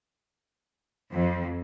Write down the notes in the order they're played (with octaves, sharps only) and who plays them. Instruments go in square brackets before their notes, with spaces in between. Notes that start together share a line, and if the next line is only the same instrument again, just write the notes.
[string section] F2